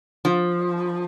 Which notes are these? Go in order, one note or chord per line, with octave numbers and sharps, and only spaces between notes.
F3